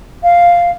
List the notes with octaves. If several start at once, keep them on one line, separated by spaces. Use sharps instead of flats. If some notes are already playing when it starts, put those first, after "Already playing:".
F5